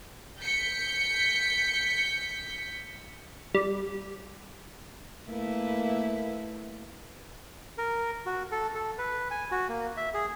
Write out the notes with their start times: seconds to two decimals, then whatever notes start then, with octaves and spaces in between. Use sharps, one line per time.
0.39 G6 B6 C#7
3.55 G3
5.28 A3 A#3 E4 B4
7.78 A#4
8.26 F#4
8.52 A4
8.75 A4
8.98 B4
9.31 G#5
9.51 F#4
9.69 A#3
9.97 E5
10.14 G#4